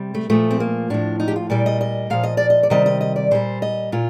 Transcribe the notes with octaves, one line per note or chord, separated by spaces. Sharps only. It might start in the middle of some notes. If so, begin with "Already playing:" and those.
Already playing: C3 G3
A3
A#2 F3 A3
C4
A#3
A2 F3 D4
D#4
G4
F4
A#2 G3 D5
D#5
D#5
A#2 F3 F5
D#5
D5
D#5
D5
C3 D#3 G3 D#5
D#5
D#5
D5
A#2 G3 C5
D#5
A#2 F4